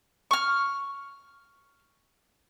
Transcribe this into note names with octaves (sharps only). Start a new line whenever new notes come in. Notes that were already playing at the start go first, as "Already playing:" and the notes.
C#6 F6